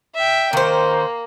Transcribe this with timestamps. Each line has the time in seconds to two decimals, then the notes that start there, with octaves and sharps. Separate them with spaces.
0.15 E5 G5
0.53 D#3 A#3 C5